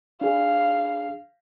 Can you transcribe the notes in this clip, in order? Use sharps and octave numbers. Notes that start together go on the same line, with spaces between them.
D4 G#4 F5